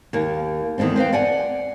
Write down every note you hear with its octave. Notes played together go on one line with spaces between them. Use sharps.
D#2 A#3
E2 D#3 F#3 A3 C4
C4 B4 F5 G5
D5 F#5 G#5